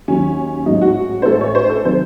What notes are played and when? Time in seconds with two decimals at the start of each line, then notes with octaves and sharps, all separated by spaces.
0.08 D#2 D#3 F#3 C#4
0.66 A1 G#2 F#3 D#4
0.81 F#4
1.22 C5
1.25 A1 A2 E3 G#3 A4
1.41 C#5
1.55 C5
1.70 A4
1.85 C3 D#3 F#3 C5